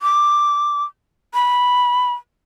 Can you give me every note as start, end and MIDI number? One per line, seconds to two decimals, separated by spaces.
0.02 0.84 86
1.34 2.13 83